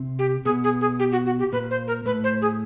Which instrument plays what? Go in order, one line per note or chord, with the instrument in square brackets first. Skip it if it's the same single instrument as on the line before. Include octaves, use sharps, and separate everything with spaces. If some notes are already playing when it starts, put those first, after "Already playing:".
Already playing: [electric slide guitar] C3 C4
[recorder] G4
[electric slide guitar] B2 B3 [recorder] G#4
[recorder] G#4
G#4
G4
F#4
F#4
G4
[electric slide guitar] A#2 A#3 [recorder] B4
[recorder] C5
A#4
[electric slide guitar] A2 A3 [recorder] B4
[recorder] C5
G#4